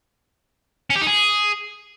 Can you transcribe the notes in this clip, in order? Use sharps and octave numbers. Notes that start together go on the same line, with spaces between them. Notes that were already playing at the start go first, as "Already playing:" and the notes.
C#4
G4
D#4
G#4